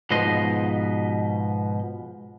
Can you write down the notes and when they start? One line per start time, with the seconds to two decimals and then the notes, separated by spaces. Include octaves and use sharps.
0.11 G#2 B2 F3 B4 D#5 C6